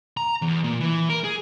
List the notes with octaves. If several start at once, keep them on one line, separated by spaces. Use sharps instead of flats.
A#5
E2
A#2
E3
A#4
G#4